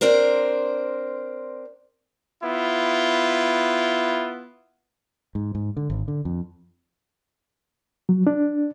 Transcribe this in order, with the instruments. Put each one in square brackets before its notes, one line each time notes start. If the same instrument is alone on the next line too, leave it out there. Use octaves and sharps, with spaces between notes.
[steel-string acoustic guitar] C4 D4 A#4 C5
[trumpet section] B3 E4 F4
[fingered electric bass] G#2
G#2
D3
G#1
D3
F2
[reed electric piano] F#3
D4